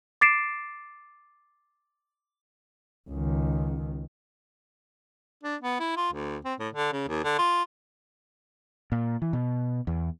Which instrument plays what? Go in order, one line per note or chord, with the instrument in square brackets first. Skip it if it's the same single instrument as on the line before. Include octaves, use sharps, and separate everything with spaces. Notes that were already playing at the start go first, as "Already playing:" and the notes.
[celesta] D6 A6 C7 D7 E7
[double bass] C#2 D#3
[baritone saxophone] D4
B3
E4
F4
D2
C4
A2
D3
C#3
D#2
D3
F4
[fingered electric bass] A#2
E3
B2
E2